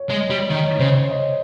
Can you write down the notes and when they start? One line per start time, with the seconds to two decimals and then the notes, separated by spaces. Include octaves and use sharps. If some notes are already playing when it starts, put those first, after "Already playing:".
Already playing: C#5
0.10 G#3 D#5
0.30 G3 C#5
0.50 D#3 D#5
0.64 C#5
0.79 C#3 C5
0.94 C#5
1.09 D#5